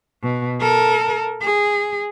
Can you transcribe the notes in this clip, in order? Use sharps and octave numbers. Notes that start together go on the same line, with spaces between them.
B2
A4 A#4
G#4